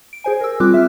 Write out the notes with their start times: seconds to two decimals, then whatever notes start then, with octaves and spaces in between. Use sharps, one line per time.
0.13 D7
0.24 G#4 C5 G#5
0.41 A#4 E6
0.60 G3 C4 F4 D6 F#6
0.74 E5 F6